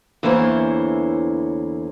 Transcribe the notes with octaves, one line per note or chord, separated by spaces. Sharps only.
E2 D3 E3 A#3 C5 C#5